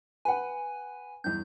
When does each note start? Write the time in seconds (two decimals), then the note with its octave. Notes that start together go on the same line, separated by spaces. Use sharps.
0.25 B4 F#5 G#5
1.24 E2 G2 G6